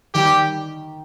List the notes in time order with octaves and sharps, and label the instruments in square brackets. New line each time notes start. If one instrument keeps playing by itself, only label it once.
[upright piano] D#3 [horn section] G3 G4